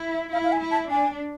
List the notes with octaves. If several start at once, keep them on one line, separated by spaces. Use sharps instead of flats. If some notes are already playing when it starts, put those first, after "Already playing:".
Already playing: E4
E5
E4 F5
F5
G#5
E4
A5
D4 G#5